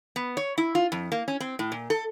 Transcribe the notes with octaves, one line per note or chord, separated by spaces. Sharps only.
B3
C#5
E4
F4
F2
A#3
C#4
C4
A2
A#2
A4